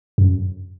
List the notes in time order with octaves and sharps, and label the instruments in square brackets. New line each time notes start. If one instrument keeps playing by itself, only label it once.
[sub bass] F#2